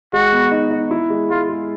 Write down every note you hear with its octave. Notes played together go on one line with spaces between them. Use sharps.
G#3 F#4
B3
D#4
D#4
E4
G#3
G#3 F4
G#3